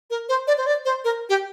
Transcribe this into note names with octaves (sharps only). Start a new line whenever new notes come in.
A#4
C5
D5
C5
D5
C5
A#4
G4